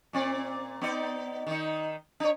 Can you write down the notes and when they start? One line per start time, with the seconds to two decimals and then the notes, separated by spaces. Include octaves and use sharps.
0.13 A#2 C4 D5
0.81 B3 D#4 D5
1.47 D#3 D#4
2.20 D4 C#5